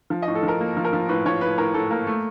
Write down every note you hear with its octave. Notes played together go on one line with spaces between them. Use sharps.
F3
D#5
A2
A4
F3
A#4
A#3
F3
A#4
F3
A2 B4
F3 C#5
A2 B4
A2 A#4
A2 A4
A#3 A#4
A3